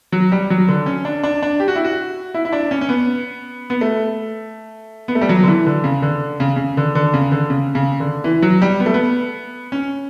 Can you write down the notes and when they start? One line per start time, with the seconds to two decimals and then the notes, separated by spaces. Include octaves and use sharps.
0.12 F#3
0.32 G3
0.50 F#3
0.68 D3
0.86 C#4
1.05 D4
1.23 D4
1.43 D4
1.60 G4
1.68 F#4
1.76 E4
1.85 F#4
2.34 E4
2.45 E4
2.53 D4
2.71 C#4
2.81 C#4
2.89 B3
3.70 B3
3.81 A3
5.08 B3
5.15 A3
5.21 G3
5.29 F#3
5.43 D3
5.47 E3
5.66 D3
5.84 C#3
6.02 D3
6.40 C#3
6.56 C#3
6.77 D3
6.95 D3
7.14 C#3
7.32 D3
7.50 C#3
7.75 C#3
8.00 D3
8.24 E3
8.42 F#3
8.62 G3
8.80 B3
8.86 A3
8.94 B3
9.72 C#4